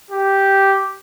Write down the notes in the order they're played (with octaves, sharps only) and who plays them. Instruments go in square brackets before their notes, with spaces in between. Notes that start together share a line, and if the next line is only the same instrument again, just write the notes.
[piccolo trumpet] G4